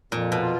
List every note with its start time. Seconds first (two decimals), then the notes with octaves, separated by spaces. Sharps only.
0.12 F2 A#2
0.32 B2
0.42 F4